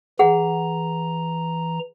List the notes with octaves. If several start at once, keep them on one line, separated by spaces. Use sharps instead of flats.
E3 G#4 F#5 A#5